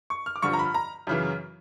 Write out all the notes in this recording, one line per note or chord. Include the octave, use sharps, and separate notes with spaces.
C#6
F6
D6
G2 D3 F3 C#6
A#5
B5
A#5
F#2 C#3 E3